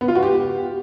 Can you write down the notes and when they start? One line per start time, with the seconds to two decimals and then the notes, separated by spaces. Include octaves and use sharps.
0.01 B3
0.08 F4
0.15 F#4
0.23 G4